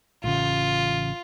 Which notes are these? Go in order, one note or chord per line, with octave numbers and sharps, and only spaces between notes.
A1 C#3 F4